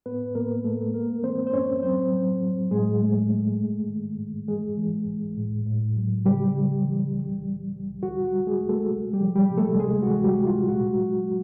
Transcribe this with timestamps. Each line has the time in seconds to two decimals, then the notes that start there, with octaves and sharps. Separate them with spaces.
0.06 A2 B3 B4
0.35 A2 A#3 A#4
0.64 A2 A3 A4
0.94 G#3 A#3 A#4
1.23 E3 C4 C5
1.47 C5
1.53 F#2 C#4 C#5
1.82 F#3 C4 C5
2.12 F#3
2.42 F#3
2.71 A2 G#3 G#4
3.01 A3
3.30 A3
3.60 G#2
3.89 D#3
4.19 G#2
4.48 E3 G#3 G#4
4.78 E3
5.07 C2
5.37 A2
5.66 A2
5.96 F#3
6.26 C#3 G3 G4
6.55 C#3
6.85 E3
7.14 C2
7.44 G3
7.73 C2
8.03 D3 F#4
8.25 F#4
8.32 G3
8.47 G#3 G#4
8.62 D2
8.69 A3 A4
8.91 C3
9.13 G3 G4
9.21 F3
9.36 G3 G4
9.51 C3
9.58 A3 A4
9.80 D2 G#3 G#4
10.02 F#4
10.10 E3
10.24 G3 G4
10.39 G#3
10.47 F4
10.68 A#2 F#4
10.98 F#3
11.28 F#3